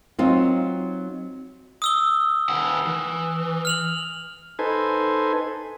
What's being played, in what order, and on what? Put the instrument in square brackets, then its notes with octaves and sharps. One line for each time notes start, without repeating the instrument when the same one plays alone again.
[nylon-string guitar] F#3 C4 D#4 F4
[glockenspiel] D#6 E6 G7
[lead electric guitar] D#2 F#5
E3
[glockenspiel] F6 F7 F#7
[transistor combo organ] D#4 A4 B4 C5 G#5